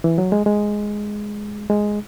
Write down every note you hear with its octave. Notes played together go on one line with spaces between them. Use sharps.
E3
F#3
G#3
G#3
G#3